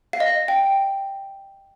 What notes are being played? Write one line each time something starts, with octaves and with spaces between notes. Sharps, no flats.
F5
D#5
G5